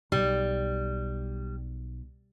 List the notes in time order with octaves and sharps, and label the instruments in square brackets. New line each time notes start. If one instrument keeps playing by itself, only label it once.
[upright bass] B1 [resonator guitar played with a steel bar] G3